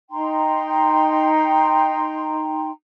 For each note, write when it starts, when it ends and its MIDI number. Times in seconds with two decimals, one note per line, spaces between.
0.11 2.70 63
0.11 2.70 79
0.11 2.70 82
0.11 2.70 84